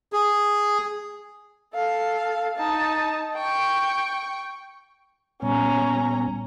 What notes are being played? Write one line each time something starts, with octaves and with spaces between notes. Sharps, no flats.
G#4
A4 F5
D#4 A5
G5 C#6
A#2 G3 B3 C#4 A#5